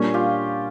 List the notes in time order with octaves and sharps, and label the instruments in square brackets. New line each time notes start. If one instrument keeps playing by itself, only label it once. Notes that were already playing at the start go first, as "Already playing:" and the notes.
Already playing: [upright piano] A#2 G3 A#3 D4 [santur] C#4
[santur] F4 G4